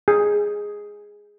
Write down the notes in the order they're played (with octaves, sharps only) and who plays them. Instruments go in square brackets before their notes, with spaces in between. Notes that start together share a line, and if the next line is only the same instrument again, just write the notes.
[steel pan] G#4